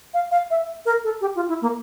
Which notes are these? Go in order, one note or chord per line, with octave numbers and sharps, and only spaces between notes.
F5
F5
E5
A#4
A4
G4
F4
E4
A#3